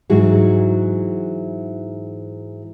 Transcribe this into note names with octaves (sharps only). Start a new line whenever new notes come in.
G#2 E3 F#3 D#4 F#4 G#4